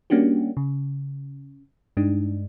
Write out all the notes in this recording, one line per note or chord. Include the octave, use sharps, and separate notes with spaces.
G3 A#3 C#4 D4 F#4 G4
C#3
G2 G#3 D4 D#4